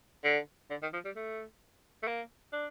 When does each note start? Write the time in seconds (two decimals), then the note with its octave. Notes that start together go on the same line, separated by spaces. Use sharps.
0.24 D3
0.70 D3
0.82 D#3
0.93 F3
1.05 G3
1.16 A3
2.03 A3
2.07 A#3
2.53 D4